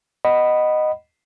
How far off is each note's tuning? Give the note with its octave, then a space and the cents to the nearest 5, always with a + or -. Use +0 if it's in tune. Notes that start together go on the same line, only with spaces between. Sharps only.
D#5 -10 F#5 +15 B5 +0